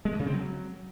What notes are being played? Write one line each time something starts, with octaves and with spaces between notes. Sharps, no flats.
G#3
G2
C#3
C4
F#3